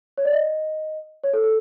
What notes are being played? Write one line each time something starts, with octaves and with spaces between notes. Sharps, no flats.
C#5
D5
D#5
C#5
A4
A4